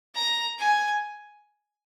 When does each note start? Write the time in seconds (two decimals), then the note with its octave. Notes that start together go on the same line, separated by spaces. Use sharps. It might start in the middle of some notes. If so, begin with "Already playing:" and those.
0.15 A#5
0.59 G#5